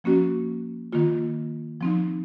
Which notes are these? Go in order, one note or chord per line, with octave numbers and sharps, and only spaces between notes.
F3 A#3 C#4 F#4
D#3 A#3 F4
F3 C4 D#4